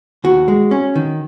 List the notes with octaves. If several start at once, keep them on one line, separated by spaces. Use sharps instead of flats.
D#2 F#4
G#3
C#4
D#3